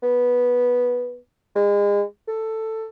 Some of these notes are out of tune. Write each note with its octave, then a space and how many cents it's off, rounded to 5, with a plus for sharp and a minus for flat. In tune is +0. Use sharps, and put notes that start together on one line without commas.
B3 -10
G#3 -35
A4 +10